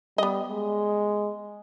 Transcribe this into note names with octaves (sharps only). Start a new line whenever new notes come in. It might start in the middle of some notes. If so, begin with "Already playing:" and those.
G3 B3 D#5
G#3